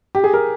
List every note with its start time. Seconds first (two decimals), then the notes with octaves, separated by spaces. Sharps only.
0.15 G4
0.24 G#4
0.34 A#4